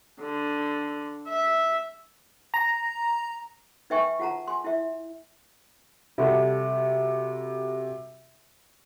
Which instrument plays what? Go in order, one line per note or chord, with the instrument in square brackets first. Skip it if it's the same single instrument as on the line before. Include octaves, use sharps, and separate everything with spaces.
[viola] D3
E5
[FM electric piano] A#5
[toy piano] D#4 B4 E5 G5 G#5 C#6
F4 F#5 A5 A#5
G#5 C6
E4 E5
[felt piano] C3 G3 F#4 A4